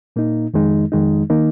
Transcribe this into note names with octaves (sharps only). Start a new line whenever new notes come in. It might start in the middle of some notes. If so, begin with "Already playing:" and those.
A#2 A#3 D#4
F2 D#3 G#3 D#4
F2 D#3 G#3 D#4
D#3 A#3 D#4